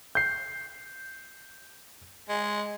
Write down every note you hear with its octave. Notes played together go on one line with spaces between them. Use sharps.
G6 C7
G#3